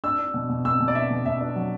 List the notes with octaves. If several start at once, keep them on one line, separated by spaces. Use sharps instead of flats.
D4 E6
D4
B2
B2
B2 E6
B2
D5
D4 E5
B2
B2 E5
D4
F#3